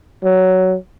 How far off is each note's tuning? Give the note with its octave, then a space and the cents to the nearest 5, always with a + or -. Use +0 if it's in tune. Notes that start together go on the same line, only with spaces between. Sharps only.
F#3 +10